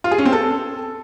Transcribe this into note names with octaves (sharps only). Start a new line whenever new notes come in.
F4
G#4
C#4
C4
A4